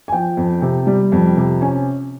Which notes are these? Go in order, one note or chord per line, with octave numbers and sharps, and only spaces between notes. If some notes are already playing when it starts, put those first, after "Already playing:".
G#5
F3 G5
F2
C3
G3
F2
C3
C#4 G#5